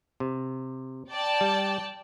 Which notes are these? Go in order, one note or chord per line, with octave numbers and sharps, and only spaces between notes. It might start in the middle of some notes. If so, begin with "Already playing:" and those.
C3
D5 G5 A5
G3